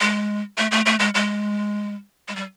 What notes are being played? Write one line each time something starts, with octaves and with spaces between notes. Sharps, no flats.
G#3
A3
A3
A3
G#3
G#3
G#3
G3